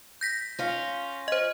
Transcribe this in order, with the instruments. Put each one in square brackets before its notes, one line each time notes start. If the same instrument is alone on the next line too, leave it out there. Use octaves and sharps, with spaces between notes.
[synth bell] G6 A#6 B6
[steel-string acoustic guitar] C#4 F4
[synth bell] C5 D#5